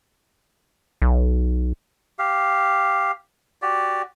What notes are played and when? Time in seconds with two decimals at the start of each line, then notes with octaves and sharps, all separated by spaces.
1.02 B1
2.19 G4 F5
3.62 F#4 G4 D5